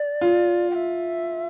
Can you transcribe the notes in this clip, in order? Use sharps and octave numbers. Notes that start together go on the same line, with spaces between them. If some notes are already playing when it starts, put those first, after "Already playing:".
Already playing: D5
F4
G5
E5